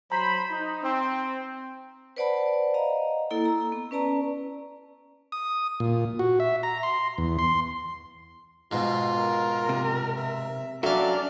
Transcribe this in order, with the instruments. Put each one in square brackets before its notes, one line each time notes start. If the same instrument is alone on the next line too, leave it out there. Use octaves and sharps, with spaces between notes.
[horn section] F#3 C5 B5 [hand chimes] A#5
[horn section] D#4
C4
[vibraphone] B4 C5 D5 F#5 A5 B5
D#5 F5 A#5
A#3 E4 A4 A#5
A#5 E6
B3
C#4 B4 D5 A5 A#5
[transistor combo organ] D#6
A#2
F#4
E5
A#5
C6
E2
C6
[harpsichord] G#2 B2 [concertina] F4
[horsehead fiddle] A#4
[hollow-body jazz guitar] C3
[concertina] E5
[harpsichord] F#3 F5 [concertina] C#4 [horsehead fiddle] D4 D5 [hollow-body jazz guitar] F#4 A4 E5